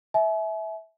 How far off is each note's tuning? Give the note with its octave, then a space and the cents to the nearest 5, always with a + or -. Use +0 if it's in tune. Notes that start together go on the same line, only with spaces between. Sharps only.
E5 -15 G#5 +45